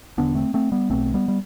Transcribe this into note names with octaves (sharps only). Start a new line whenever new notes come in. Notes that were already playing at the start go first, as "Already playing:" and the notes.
E1 E2 D3 B3 D4
A3 C4
A3 C4
G3 B3
B1 B2 A3 C4
G3 B3
G3